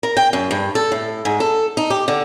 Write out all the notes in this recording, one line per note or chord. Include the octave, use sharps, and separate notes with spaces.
A#4
G5
F#2
G2
A4
A2
G#2
A4
D#4
G4
D3